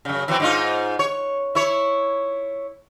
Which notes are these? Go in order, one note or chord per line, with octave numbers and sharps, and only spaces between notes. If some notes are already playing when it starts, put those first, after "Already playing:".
F#2 C#3
E3 F#3 C4
G#2 D#4 F4
C#5
E4 C#5